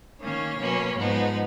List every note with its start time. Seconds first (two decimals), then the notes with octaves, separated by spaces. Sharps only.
0.21 D#3 A#3 C#4 C#5
0.59 B2 F#3 A#3 C#4
0.98 G#2 F3 G#3 B3 D#4